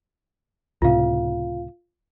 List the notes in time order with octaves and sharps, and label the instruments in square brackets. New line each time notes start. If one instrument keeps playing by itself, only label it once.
[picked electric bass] C#2 A2 C3 [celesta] F4 F5